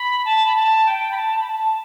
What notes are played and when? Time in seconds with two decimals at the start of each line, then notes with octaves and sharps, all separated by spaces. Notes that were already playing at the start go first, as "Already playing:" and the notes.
Already playing: B5
0.25 A5
0.46 B5
0.55 A5
0.86 G5
1.11 B5
1.16 A5
1.39 B5
1.47 A5